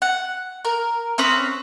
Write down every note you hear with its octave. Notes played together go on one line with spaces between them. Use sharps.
F#5
A#4
C4 C#4 B4 D#6